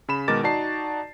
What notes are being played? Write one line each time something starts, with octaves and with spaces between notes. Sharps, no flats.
C#3 B5 E7
B2 D#3 G#3 A#4 D6 A6
D#4 F#4 D5 A5 C7